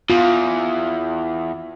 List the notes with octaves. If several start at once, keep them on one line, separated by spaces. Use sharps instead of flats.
E2 F4